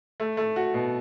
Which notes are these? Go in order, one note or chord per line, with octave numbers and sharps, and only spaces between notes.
A3
A3
F#4
B2